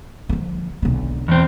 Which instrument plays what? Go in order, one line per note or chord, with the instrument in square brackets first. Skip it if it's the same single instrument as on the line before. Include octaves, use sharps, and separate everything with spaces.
[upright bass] D3 F3
B1 D3
[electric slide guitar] E2 C4